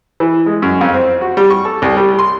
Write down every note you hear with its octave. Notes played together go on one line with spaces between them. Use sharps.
E3
G#3
F#2
F2
C4
F#4
G3
C#6
A4
C2
G3
C6